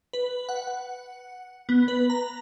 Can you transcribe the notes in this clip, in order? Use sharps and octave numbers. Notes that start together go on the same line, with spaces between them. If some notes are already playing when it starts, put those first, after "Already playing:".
B4
F#5
F#5
B3
B4
A#5